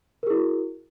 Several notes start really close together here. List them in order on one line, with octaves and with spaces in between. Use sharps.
A#4 G#4 E4 F#4